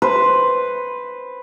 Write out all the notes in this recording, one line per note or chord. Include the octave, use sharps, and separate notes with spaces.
B4 C5